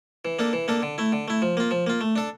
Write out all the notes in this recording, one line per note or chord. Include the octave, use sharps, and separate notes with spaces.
E3
A#3 D4 A4
E3
A#3 D4 A4
D3
A3 E4
D3
A3 E4
F3
A#3 F4
F3
A#3 F4
A3
D4 A4